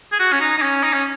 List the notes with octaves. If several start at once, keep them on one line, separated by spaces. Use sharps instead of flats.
G#4
F#4
C#4
D#4
D#4
C#4
D#4
C#4